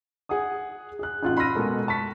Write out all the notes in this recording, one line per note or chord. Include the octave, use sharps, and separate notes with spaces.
G#4 F#5 G#5 D#6
G#4 F#6
A1 D#4 F4 F#4 F#6
B5 C6 E6 F6 A#6 D#7
B2 G#3 A4 A#4
A5 C#6 B6